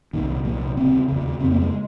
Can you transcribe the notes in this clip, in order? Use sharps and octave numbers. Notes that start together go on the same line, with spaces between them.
C2 A#2 D#3
C2 A#2 F3
D#2 C#3 C4
D#2 C#3
F2 C#3 C4
A#3
G#3